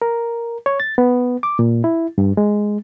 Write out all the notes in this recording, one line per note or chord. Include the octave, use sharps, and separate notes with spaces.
A#4
C#5
A6
B3
D6
A#2
E4
G2
G#3